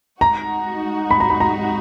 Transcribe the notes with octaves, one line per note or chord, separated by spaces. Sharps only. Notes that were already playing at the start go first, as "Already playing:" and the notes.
G#3 D#4 F#4 A#5
B5
A#5
B5
A#5